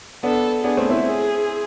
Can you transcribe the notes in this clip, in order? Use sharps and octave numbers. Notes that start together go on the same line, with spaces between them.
B3 D4 A4
B3 D4 G#4
A3 C4
C4 E4
G#4